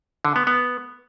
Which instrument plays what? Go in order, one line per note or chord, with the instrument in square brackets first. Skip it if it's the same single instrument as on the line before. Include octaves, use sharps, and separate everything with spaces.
[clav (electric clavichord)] D3
B3
B3